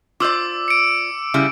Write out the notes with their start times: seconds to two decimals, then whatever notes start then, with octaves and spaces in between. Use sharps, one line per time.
0.20 F4 C5 D5 D6 E6
0.68 C#7 D7
1.34 C#3 G3 E4